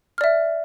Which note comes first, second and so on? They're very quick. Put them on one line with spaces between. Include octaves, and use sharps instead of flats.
F6 D5 E5